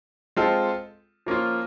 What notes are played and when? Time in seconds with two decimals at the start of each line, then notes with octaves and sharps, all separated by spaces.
0.37 G#3 C4 F4 A4
1.26 F3 A#3 C#4 F4